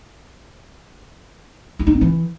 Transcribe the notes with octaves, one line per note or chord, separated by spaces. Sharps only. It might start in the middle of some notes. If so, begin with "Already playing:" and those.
E4
D#4
C4
E3